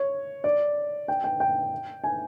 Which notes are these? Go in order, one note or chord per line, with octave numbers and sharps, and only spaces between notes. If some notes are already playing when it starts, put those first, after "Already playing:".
Already playing: C#5
D5
G5
G5
G5
G#5